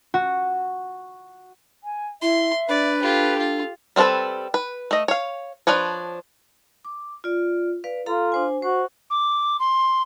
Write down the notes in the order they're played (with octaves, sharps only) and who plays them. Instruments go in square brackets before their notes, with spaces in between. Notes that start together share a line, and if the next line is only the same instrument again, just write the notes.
[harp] F#4
[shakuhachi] G#5
[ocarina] E4 [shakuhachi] E5 [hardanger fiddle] C6
[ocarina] D4 [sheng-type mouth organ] B4 [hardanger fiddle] D5
[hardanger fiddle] F4 G4 [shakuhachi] A4
[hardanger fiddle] F4
[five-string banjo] G3 C4 F4 A4 B4
B4
A3 D#5
C#5 F5
F3 D4 B4 C#5
[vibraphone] D6
F4 D5
B4 D5 F5
[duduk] F4 [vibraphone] A4 F5 A#5
[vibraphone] D4 C5 G#5
[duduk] F#4 [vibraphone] C5
[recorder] D6
C6